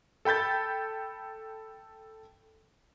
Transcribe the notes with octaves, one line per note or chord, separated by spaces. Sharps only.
A4 G5 B5 G6 A6